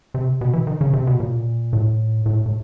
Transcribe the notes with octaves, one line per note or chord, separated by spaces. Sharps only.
C3
B2
E3
D#3
C#3
C3
B2
A#2
A2
A2
A2